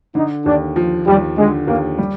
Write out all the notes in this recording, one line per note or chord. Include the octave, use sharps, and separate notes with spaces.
D3 D#4
D#2 D4
F3
D#2 G3
D3 G#3
D#2 A#3
G3